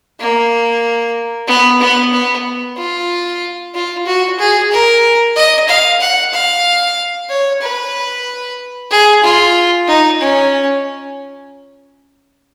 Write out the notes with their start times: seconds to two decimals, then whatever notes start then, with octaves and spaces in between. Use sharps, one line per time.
0.20 A#3
1.48 B3
1.81 B3
2.13 B3
2.77 F4
3.74 F4
4.06 F#4
4.39 G#4
4.71 A#4
5.36 D#5
5.68 F5
6.01 F#5
6.33 F5
7.29 C#5
7.61 B4
8.91 G#4
9.23 F4
9.87 D#4
10.20 C#4